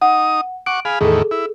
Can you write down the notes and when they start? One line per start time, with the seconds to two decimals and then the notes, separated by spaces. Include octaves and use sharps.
0.02 D#4 F#5 D#6
0.66 F#5 C#6 D6 D7
0.85 G#4 F5 B5
1.01 E2 A2 D#3 G#4 A4
1.31 E4